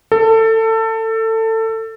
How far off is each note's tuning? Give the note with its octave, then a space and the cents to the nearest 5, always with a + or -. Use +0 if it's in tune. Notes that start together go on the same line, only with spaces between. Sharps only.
A4 +25